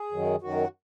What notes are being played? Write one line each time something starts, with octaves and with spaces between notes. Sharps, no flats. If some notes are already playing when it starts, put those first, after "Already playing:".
Already playing: G#4
F#2 D#3 F#3
F#2 D#3 F#3 F#4